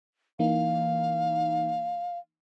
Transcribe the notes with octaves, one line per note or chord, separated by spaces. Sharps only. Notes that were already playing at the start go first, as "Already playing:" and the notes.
E3 A#3 D#4 F5